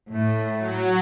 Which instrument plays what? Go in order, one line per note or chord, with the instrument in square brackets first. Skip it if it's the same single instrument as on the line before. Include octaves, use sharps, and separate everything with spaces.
[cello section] A2 [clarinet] A3
[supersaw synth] F#3